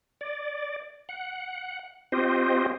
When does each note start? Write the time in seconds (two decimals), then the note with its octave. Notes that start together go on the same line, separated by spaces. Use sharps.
0.21 D5
1.09 F#5
2.12 C4 F4 G4 C5 D#5